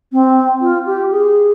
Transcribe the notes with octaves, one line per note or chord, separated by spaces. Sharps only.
C4
F4
G4
G#4